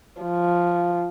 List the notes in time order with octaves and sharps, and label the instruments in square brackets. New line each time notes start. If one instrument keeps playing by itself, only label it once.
[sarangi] F3